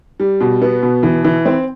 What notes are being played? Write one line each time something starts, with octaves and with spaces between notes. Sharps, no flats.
G3
B2
B3
B2
E3
E3
C4